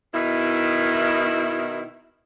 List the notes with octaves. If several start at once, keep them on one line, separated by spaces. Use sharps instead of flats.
B2 D#3 D#4 E4